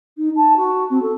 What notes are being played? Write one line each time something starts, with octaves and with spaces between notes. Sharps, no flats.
D#4
A5
F#4
C4
A4